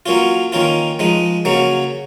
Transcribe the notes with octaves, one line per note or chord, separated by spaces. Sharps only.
F#3 A#3 C#4 F4
D#3 A#3 C#4 F4
F3 G#3 D#4
C#3 F#3 A#3 C#4